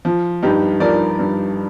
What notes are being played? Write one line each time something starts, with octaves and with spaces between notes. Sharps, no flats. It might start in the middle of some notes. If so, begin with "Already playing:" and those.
F3
G2 D#4 G4
F3 A#4 D5
G2